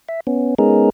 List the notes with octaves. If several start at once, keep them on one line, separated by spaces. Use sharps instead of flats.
E5
B3 C#4
G#3 B3 C#4 D#4 G#4 A#4